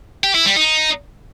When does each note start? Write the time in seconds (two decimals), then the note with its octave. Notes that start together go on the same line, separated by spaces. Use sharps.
0.24 G4
0.35 E4
0.46 G3
0.57 D#4